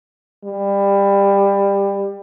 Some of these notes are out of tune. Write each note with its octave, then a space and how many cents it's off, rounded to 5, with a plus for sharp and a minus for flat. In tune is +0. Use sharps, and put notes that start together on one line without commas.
G3 +20